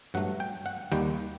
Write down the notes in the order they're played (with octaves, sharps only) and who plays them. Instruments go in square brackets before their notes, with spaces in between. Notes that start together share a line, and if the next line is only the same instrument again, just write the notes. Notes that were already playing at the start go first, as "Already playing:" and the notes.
[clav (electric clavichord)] G2 F#3 A3 F#5
G5
F#5
D#2 D#3 G3 A#3 G5